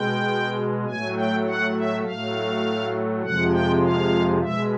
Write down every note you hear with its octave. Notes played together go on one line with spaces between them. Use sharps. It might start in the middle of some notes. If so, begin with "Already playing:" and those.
Already playing: B2 G#3 G5
A2 F#3 A3 G#5
G5
F#5
E5
A2 F#3 A3 F5
F2 C3 F3 G#3 F#5
G5
F5
B2 G#3 E5